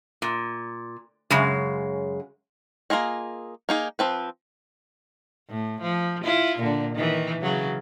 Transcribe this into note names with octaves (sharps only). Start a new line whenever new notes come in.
A#2
F#2 C#3 G#3
A#3 E4 F4 G#4 D#5
A#3 D#4 G#4
F3 C4 B4
A2
F3
E4 F4
A#2 D3
D#3 E3
C#3 F#3